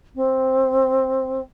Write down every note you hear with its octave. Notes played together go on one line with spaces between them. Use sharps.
C4